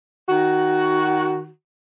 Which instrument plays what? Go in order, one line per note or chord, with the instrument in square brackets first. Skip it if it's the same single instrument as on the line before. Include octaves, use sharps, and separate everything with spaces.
[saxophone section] D#3 F#4